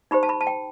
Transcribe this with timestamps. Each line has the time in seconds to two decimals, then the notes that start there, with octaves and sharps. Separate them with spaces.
0.11 D#4 G4 C5 B5
0.23 A5
0.29 B5
0.41 A5
0.47 G5